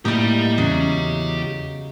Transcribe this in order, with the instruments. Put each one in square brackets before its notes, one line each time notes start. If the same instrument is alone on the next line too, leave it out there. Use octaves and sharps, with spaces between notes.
[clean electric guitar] A2 A#3 [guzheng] D#4 D#5 [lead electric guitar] G4 B5
[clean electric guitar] E2 [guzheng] C#3 F#3